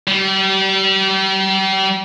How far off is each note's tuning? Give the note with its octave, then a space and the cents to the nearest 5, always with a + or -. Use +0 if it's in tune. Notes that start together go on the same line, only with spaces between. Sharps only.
G3 -35